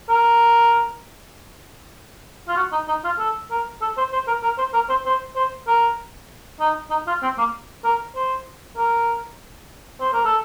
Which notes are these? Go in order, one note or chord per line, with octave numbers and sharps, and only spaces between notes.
A#4
F4
F#4
D#4
D#4
F4
A4
A#4
A4
C5
C5
A#4
A#4
C5
A#4
C5
C5
C5
A#4
D#4
D#4
F4
C4
A#3
A#4
C5
A#4
C5
A#4
A4